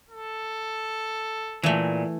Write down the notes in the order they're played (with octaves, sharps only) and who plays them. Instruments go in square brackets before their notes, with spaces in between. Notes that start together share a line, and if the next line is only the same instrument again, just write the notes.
[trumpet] A4
[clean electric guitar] A#2 [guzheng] E3 A3